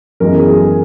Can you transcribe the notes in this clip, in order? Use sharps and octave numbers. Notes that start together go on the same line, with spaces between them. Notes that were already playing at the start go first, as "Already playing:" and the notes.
F#2 E3 G#3 B3 A#4
G#4
G#4
G#4